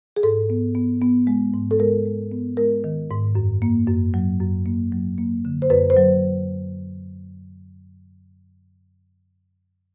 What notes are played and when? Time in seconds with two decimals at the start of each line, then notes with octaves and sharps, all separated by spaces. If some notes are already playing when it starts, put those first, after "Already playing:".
0.16 G#4
0.23 G#2 A4
0.50 B3
0.75 B3
1.02 B3
1.27 G#3
1.54 G#2
1.71 A4
1.79 G#3 A#4
2.06 G#3
2.32 B3
2.57 G#3 A#4
2.84 D#3
3.10 G#2
3.35 F#2
3.62 A#3
3.88 F#2
4.14 F#3
4.40 F#2
4.66 A#3
4.92 F#3
5.18 A#3
5.45 D3
5.62 C5
5.70 F#2 B4
5.90 C5
5.97 F#3